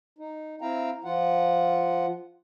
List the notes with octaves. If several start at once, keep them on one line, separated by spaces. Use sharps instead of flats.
D#4
C4 E4 F5 G5 A#5
F3 F4 F#5